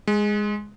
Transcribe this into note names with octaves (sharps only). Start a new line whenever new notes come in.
G#3